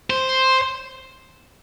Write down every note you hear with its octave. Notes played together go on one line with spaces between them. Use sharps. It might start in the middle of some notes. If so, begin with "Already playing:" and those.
C5